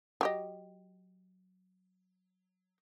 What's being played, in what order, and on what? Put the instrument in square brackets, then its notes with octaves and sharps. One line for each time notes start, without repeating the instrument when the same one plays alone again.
[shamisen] F#3 G4 D#5